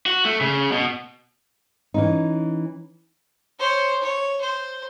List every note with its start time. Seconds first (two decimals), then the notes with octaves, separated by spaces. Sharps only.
0.06 F#4
0.25 A3
0.41 C#3
0.72 B2
1.94 E3 C#4 D#4
3.59 C5 C#5
4.01 C#5
4.41 C5